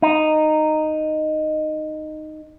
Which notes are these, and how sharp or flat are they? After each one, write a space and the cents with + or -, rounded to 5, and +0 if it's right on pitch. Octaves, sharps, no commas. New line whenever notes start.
D#4 -10